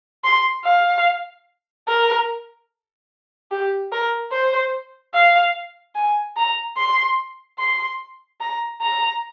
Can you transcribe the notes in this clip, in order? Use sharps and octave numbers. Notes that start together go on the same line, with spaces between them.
C6
F5
A#4
G4
A#4
C5
F5
G#5
A#5
C6
C6
A#5
A#5